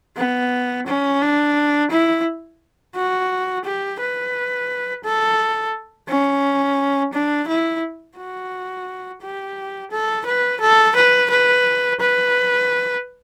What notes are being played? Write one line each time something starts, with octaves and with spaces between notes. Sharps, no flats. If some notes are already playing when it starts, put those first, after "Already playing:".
B3
C#4
D4
E4
F#4
G4
B4
A4
C#4
D4
E4
F#4
G4
A4
B4
A4
B4
B4
B4